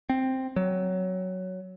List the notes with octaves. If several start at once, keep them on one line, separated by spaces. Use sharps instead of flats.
C4
F#3